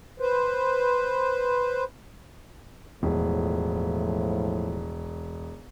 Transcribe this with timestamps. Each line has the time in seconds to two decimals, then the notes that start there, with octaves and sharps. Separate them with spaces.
0.20 B4 C5
3.03 E1 A2 F3